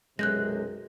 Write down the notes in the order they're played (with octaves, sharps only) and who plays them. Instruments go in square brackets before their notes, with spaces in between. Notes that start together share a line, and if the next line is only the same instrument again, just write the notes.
[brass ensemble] B1 F#2 C3 [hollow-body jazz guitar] G#3 [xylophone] F#6 G6 A#6